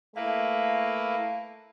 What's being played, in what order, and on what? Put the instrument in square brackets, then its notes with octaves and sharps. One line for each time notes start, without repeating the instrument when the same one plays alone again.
[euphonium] A3 [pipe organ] A#3 E4 B4 [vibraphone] F5